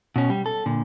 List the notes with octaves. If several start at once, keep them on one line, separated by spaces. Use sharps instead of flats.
B2 C#4
G3
A4
A#2 D3